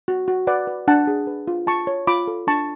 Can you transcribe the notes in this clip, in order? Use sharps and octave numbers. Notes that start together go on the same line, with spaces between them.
F#4
F#4
B4 D5 F#5
B4
D4 F#5 A5
G#4
B4
F4
F4 A5 C#6
C#5
F4 B5 D6
A4
D4 A5 C#6